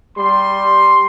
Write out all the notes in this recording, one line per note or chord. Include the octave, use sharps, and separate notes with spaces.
G3 C6